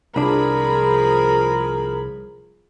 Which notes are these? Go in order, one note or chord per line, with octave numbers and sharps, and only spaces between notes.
C2 F3 D4 G#4 A#4 B5